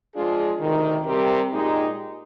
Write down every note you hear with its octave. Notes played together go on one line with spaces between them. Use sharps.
F3 G#3 D4 F4 G#4
D2 C3 D#3
C3 G3 C4 G4 A#4
A#2 G#3 D#4 G4